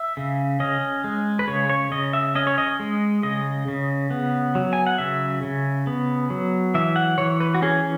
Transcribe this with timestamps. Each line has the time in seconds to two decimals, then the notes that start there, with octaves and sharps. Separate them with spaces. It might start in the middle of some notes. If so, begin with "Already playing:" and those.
Already playing: E5
0.17 C#3
0.60 C#4 D#5
1.04 G#3
1.39 B4
1.48 C#3 C#5
1.69 C#5
1.92 C#3 D#5
2.13 E5
2.35 C#4 D#5
2.47 C#5
2.58 D#5
2.80 G#3
3.23 C#3 D#5
3.68 C#3
4.11 B3
4.55 F#3
4.73 G#5
4.87 F#5
4.98 C#3 E5
5.43 C#3
5.87 B3
6.30 F#3
6.74 E3 E5
6.96 F#5
7.18 E3 C#5
7.40 B4
7.55 F#4
7.62 C#4 G#4